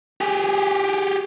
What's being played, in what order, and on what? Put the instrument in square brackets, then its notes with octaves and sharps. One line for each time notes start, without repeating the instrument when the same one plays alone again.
[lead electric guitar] G4 G#4